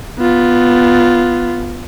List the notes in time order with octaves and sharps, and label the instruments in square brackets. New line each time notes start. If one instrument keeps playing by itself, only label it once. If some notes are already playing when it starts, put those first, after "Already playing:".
[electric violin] B3 F4